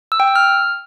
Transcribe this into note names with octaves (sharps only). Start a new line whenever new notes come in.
E6
G5
E6
F6